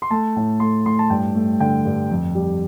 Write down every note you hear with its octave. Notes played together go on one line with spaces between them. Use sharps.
C6
A3 A5
A2
A3 C6
A2 C6
A5
G2 G5
A3
D3 G5
G2
F2
G3